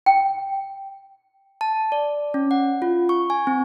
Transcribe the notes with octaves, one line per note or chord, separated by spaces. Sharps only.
G5
A5
D5
C#4
F#5
F4
C#6
G#5
C4